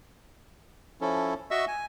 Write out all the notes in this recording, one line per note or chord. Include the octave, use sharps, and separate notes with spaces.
F3 C#4 E4 A4
F#4 D#5 E5 C#6 E6
G#5